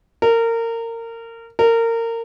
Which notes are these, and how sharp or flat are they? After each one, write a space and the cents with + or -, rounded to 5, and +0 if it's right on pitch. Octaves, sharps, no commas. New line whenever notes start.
A#4 -25
A#4 -25